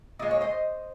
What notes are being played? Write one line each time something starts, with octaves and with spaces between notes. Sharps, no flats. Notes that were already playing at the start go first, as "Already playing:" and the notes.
A#2 G#3 D#5
C#5
C5 D#5